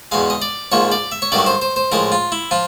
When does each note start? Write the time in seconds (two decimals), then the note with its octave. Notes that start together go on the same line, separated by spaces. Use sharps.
0.12 E2 B2 G#3 F5
0.30 D#5
0.42 D5
0.72 A#1 G#2 F3 A#3 C#5
0.92 D5
1.12 E5
1.22 C#5
1.32 G2 D#3 F#3 A3 D5
1.46 C5
1.62 C5
1.76 C5
1.92 A2 F3 G#3 A#4
2.12 F4
2.32 E4
2.51 F3 F4